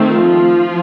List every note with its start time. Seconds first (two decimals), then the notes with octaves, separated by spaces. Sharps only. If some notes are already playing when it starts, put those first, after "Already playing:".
Already playing: D#3 A3 C4
0.10 F3 F4